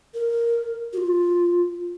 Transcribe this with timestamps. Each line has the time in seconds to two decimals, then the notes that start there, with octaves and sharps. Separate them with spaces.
0.14 A#4
0.93 F#4
0.98 F4